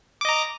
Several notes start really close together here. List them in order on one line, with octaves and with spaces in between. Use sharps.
D6 D#5 A#5